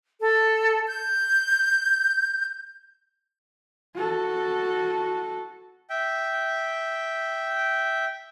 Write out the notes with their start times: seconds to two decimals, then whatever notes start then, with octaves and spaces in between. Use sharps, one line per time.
0.21 A4
0.88 G6
3.95 F#4 A4
5.90 E5 G5